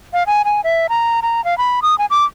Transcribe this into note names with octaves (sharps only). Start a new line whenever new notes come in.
F5
G#5
G#5
E5
A#5
A#5
F5
B5
D#6
G#5
D6